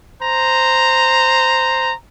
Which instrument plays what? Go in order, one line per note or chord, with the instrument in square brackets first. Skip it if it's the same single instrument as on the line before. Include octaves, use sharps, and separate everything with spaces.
[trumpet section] C5 A#5